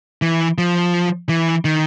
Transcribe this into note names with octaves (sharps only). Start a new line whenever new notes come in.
E3
F3
E3
D#3